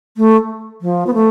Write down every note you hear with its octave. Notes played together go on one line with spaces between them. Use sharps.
A3
F3
B3
A3